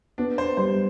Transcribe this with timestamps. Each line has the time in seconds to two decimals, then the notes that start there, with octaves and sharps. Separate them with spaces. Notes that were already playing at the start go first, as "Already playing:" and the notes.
0.18 B3 D4
0.38 C5
0.57 G3 C5